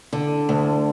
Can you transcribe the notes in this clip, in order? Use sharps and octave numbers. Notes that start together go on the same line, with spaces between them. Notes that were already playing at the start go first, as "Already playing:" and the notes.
D3
D2